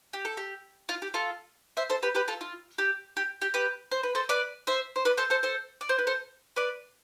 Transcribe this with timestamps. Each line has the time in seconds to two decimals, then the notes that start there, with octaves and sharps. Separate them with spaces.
0.13 G4
0.25 A4
0.37 G4
0.89 F4
1.02 G4
1.14 F4 A4
1.77 C5 E5
1.90 A4 C5
2.03 G4 B4
2.15 G4 B4
2.28 F4 A4
2.41 F4
2.78 G4
3.17 G4
3.41 G4
3.54 G4 B4
3.92 C5
4.03 B4
4.15 A4 C5
4.29 B4 D5
4.67 C5 E5
4.96 C5
5.05 B4 D5
5.17 A4 C5
5.30 A4 C5
5.43 A4 C5
5.81 D5
5.89 C5
5.99 B4
6.07 A4 C5
6.56 B4 D5